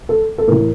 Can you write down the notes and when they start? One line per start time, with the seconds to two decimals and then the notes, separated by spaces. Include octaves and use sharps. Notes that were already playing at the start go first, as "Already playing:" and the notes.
0.09 A4
0.38 A4
0.47 A2 E3 A#4